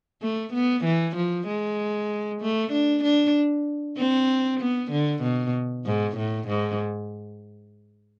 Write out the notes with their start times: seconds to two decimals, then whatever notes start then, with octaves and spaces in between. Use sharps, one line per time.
0.22 A3
0.53 B3
0.85 E3
1.16 F3
1.47 G#3
2.41 A3
2.72 D4
3.04 D4
3.98 C4
4.60 B3
4.91 D3
5.22 B2
5.86 G#2
6.17 A2
6.48 G#2